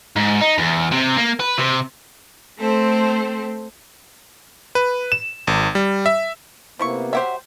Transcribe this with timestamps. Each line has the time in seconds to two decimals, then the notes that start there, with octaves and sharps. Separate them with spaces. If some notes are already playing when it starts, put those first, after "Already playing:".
0.16 G#2
0.41 D#4
0.58 E2
0.92 C3
1.17 A#3
1.40 B4
1.58 C3
2.58 A3 C4 A4 C5
4.75 B4
5.12 E7
5.47 G#1
5.75 G3
6.06 E5
6.79 C3 F3 A#3 B3 E4 C#6
7.13 F#3 G4 C5 E5 F#5